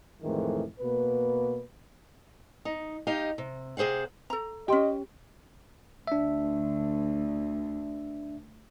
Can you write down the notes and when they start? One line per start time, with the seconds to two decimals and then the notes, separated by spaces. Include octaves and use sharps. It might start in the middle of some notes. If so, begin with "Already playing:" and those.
0.23 F2 A2 D#3 E3 G#3
0.80 B2 A#3 B4
2.65 D#4
3.07 D#4 G4 D#5 F5
3.38 C3
3.77 C3 G#4 C5 F5 F#5
4.30 A4 A#5
4.68 C#4 G4 D#5 G5 C6
6.07 D2 D4 E5